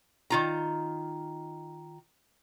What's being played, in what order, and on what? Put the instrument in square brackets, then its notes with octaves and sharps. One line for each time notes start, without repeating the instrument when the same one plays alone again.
[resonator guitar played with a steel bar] D#3 F4 A#5